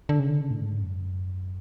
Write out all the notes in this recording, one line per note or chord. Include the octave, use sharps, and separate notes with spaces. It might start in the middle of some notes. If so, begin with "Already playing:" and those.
D3
C#3
D3
C#3
A2
G#2
F#2